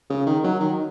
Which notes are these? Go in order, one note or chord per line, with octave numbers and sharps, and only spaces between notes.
C#3
D#3
F#3
D#3